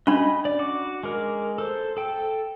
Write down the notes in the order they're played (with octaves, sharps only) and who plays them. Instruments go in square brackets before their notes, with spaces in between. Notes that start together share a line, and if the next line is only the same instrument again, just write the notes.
[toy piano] C#4 D4 [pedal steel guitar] D#5 B5
[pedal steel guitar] D5
F#4 D6
G#3 A#4
A4 C5
A4 G5